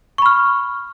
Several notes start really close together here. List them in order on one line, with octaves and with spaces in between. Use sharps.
C#6 B5 F6